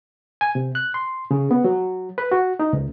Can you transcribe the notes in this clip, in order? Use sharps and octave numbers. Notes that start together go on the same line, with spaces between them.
G#5
C3
F#6
C6
C#3
B3
F#3
B4
F#4
D#4
C#2